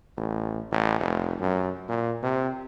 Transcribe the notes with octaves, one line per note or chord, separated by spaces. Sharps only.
A1
A1
F1
F#2
A#2
C3